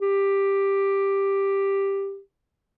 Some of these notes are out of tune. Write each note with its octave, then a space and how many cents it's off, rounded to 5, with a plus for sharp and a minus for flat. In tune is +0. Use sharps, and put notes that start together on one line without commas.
G4 +5